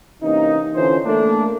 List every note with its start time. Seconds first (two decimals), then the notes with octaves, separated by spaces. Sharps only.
0.22 C3 E3 A#3 C#4 D#4
0.75 D3 E3 C#4 F4 C5
1.06 A3 A#3 D4